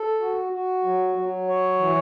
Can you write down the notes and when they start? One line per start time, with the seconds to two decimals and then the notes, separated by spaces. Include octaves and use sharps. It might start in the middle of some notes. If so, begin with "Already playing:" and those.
Already playing: A4
0.20 F#4
0.52 F#4
0.84 F#3
1.16 F#3
1.48 C#5
1.79 E3